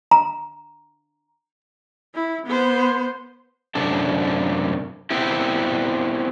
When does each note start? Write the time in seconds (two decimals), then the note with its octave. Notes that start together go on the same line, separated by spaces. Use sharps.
0.11 A#5
2.15 E4
2.46 B3 C5
3.75 F#2 C3 D4 A4
5.10 B3 C4 E4 G4